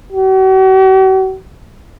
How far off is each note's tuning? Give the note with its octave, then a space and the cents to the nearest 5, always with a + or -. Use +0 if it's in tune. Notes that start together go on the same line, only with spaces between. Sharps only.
F#4 +45